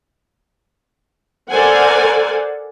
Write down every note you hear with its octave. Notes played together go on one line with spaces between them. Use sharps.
A4 A#4 C5 D5 F#5 G#5